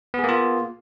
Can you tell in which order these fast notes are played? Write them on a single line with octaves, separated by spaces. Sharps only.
B3 G#4 A#3 F4